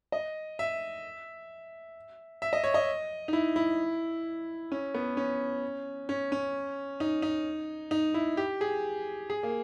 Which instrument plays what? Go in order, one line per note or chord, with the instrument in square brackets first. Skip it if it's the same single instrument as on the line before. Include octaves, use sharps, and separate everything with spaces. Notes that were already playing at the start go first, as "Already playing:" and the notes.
[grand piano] D#5
E5
E5
D#5
C#5
D#5
D#4
E4
E4
C#4
B3
C#4
C#4
C#4
D#4
D#4
D#4
E4
G4
G#4
G#4
A#3